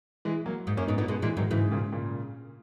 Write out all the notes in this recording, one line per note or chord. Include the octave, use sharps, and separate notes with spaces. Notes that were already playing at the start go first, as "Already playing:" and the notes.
E3 G#3
F#3 A#3
G#2
F#2 A#3 C#4
G#2 B3 D#4
A#2 B3 D#4
B2 G#3 B3
A#2 E3 G#3
G#2 D#3 F#3
G#2 C#3 E3
A#2 C#3
A#2 C#3